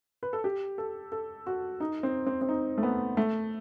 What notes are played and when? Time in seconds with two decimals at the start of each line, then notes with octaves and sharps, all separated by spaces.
0.23 B4
0.33 A4
0.44 G4
0.78 A4
1.12 A4
1.47 F#4
1.80 D#4
2.03 C4
2.26 C4
2.41 C4
2.49 D#4
2.78 A3
2.83 B3
3.17 A3